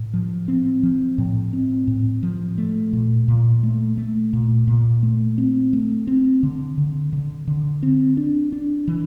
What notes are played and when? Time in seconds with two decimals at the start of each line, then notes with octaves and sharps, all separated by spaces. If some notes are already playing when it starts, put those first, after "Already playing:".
Already playing: A2
0.13 F3
0.48 C4
0.83 F3
1.18 A2
1.53 C4
1.88 A2
2.23 F3
2.58 A3
2.93 A#2
3.28 A#2
3.63 A3
3.98 A3
4.33 A#2
4.68 A#2
5.03 A3
5.38 C4
5.73 A3
6.07 C4
6.43 D3
6.78 D3
7.13 D3
7.47 D3
7.83 C4
8.17 D4
8.52 D4
8.88 E3